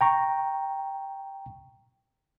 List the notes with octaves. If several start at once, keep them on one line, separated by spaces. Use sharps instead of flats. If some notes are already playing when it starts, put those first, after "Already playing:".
G5 A#5 C#6